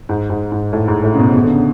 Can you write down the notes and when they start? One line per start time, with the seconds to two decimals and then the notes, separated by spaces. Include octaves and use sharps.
0.09 G#2
0.30 G#2
0.52 G#2
0.73 A2
0.88 G#2
1.04 A2
1.14 C#3
1.19 B2
1.34 B2
1.44 D3
1.51 C#3